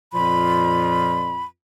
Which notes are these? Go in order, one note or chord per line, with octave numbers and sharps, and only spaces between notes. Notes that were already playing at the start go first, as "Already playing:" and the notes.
F2 A#2 F3 F4 B5